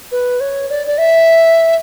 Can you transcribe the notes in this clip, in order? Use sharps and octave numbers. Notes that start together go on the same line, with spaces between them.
B4
C#5
D5
D5
E5